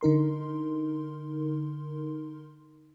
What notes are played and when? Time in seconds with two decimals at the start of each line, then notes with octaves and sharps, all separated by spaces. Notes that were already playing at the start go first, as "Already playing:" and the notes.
0.01 D3 D#4 A#4 C6